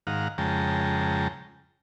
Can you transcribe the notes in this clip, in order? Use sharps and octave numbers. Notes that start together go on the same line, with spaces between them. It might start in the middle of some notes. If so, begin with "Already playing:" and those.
G#2 D#3 F5 F#5 A#5
F2 C#3 G#3 G5 A5 A#5